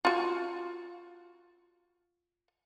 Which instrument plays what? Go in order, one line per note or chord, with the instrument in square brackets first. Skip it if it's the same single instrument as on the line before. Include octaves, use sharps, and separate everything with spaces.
[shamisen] F4 F#4